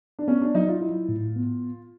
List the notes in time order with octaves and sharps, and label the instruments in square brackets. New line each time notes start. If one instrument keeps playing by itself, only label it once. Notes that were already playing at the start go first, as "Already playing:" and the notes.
[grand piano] D4
[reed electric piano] B3 [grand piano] C#4
[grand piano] D4
[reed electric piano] F#3 [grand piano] D#4
[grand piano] F4
[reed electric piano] E4
A2
B3